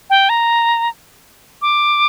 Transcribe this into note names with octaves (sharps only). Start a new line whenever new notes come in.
G5
A#5
D6